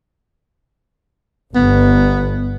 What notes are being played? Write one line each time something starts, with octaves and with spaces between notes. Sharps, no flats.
G1 B3